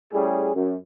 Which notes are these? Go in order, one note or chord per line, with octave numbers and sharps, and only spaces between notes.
A2 G3 C#4 G#4
F#2